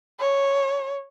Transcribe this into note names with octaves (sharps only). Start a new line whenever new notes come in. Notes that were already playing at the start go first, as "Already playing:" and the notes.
C#5